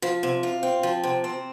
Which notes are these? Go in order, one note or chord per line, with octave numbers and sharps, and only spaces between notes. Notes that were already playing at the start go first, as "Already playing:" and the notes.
F3
C3
F4
C4
F3
C3
C4